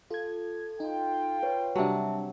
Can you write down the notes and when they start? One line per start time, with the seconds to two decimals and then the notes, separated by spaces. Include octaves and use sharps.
0.10 F4 A4 G#6
0.80 D#4 F4 G5
1.43 B4 C#5
1.76 C3 F#3 G3 D4 E5 A5